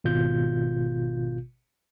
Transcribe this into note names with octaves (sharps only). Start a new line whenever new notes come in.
G#1 B2 F4 G6